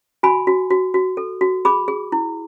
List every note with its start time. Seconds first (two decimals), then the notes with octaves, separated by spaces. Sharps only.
0.23 F#4 G#5 B5
0.47 F#4
0.70 F#4
0.94 F#4
1.17 A4
1.41 F#4
1.65 G#4 B5 D6
1.88 G#4
2.12 E4